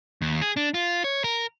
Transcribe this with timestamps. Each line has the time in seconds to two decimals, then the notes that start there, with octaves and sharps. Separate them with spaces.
0.22 D#2
0.42 G#4
0.57 D4
0.74 F4
1.04 C#5
1.24 A#4